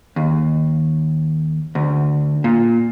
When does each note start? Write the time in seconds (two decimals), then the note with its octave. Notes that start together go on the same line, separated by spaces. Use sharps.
0.16 D#2
1.75 D2
2.44 A#2